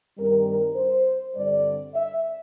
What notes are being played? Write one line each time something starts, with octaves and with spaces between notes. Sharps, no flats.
G2 D#3 G3 C4 A#4
A#4
C5
G2 D3 G3 C4 D5
E5